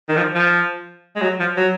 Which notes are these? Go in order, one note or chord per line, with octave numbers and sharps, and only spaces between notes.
D#3
F3
F3
G#3
F#3
F3
F#3